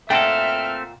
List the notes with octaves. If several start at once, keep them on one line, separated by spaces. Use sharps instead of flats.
A#2 A3 C4 A4 E5 F#5 G5 F6